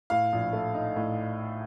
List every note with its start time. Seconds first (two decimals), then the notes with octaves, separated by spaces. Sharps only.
0.10 A2 F5
0.32 A#1
0.53 A3
0.74 D#4
0.96 A2